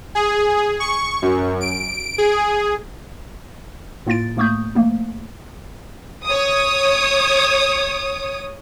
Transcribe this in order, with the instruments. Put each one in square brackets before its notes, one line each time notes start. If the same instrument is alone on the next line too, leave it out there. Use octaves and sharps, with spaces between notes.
[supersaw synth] G#4
C#6
F#2
D7
G#4
[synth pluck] A2 A#3 F4 A6 D7
A2 A3 A#3 C#6 D#6 G6
F3 A3 A#3 D#4
[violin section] C#5 D#6